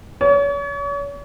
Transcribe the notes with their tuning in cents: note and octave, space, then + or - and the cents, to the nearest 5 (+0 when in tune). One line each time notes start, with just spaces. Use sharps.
C#5 +40